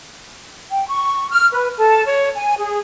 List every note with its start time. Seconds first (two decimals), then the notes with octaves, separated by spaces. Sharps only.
0.70 G5
0.87 C#6
1.29 F6
1.52 B4
1.77 A4
2.06 C#5
2.35 G#5
2.59 G#4